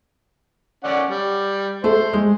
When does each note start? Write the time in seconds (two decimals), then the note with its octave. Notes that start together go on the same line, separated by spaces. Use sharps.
0.84 C#4 D5 F#5
1.10 G3
1.84 A3 C5
2.13 G#3